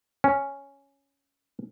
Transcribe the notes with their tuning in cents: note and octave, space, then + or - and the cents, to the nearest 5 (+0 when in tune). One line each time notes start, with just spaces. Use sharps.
C#4 +0